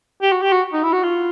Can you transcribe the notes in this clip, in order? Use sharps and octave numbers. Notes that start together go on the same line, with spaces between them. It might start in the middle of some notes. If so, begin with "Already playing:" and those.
G4
F#4
G4
F#4
D#4
E4
F#4
F4